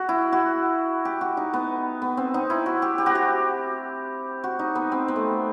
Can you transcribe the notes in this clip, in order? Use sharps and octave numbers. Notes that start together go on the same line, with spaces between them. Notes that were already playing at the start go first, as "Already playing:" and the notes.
Already playing: F#4
E4
F#4
G4
F#4
D#4
B3
B3
C4
D#4
E4
F#4
G4
G4
F#4
G4
F#4
D#4
B3
C4
B3
A3